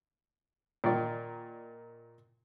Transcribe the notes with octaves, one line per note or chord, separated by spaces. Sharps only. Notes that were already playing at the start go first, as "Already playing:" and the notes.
A#2 D#3 D5